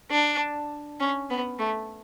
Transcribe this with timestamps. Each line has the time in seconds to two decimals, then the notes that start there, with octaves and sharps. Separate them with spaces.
0.11 D4
1.00 C#4
1.30 B3
1.59 A3